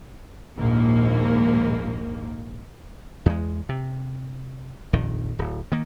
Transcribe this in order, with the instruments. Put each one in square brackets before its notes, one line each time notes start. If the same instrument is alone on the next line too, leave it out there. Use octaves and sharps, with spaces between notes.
[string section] A#1 D#2 G#2 A#3
[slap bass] E2 G#3
C3
D#1 A#1 F2 D#3
D1
D#3 A#3